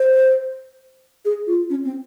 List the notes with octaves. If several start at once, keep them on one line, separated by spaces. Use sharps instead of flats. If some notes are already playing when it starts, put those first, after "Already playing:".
Already playing: C5
G#4
F4
C#4
C4